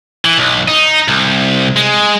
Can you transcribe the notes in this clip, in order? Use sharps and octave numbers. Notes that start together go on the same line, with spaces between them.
E3
B1
D#4
C2
G#3